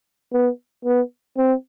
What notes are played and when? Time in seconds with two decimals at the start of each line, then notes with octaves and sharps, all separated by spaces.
0.32 B3
0.85 B3
1.37 C4